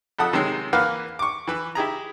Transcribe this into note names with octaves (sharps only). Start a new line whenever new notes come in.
F2 A4 F#5 D#6
C3 D#3 F#3 G#3
E3 A#3 B4 F5 F#5
C#6 D6
E3 B4
E4 G4 G#4 A#5